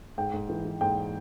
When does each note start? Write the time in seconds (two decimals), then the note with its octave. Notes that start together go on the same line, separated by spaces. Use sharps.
0.18 G#2 G5
0.33 G#2
0.50 E3
0.65 E3
0.81 G#2 G5